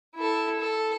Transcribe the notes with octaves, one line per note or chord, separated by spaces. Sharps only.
E4 A4
A4